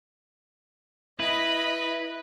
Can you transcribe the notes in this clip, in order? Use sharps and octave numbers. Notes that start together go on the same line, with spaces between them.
E4 B4 D#5 B5